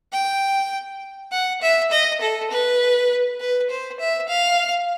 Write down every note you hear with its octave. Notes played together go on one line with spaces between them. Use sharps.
G5
F#5
E5
D#5
A4
B4
B4
C5
E5
F5